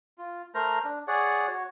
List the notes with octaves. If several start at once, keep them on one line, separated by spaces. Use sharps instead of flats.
F4
A3 A#4 C5 A#5
D4
G#4 C#5 D5 F#5
F#4 C#5